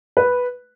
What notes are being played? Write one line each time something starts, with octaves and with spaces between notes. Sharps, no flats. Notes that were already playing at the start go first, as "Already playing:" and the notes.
B4